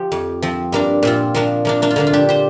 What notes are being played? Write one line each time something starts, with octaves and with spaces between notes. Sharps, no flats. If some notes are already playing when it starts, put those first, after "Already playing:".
Already playing: F3 G4
F2
F3 C4
G2 A#3 D4
A#2 C4 F4
F3 A#3 D4
F3 A#3 D4
A#3 D4
F4
D3 A#3 D4
F4
D4 G4
G4 C5